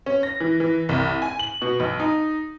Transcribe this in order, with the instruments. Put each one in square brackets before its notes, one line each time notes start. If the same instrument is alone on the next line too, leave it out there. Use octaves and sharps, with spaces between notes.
[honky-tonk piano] C#4
A#6
E3
E3
C2
G#5
F#7
B2
B1
D#4